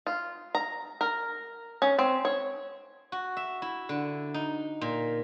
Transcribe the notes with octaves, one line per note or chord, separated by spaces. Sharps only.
F4
A#5
A#4
C#4
C4
C#5
F#4
E5
E4
D3
D#4
A#2